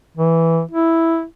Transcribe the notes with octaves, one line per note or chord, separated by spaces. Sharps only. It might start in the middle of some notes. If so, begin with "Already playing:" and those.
E3
E4